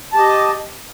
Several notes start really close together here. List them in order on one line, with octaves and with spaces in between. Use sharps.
A5 G4 D#5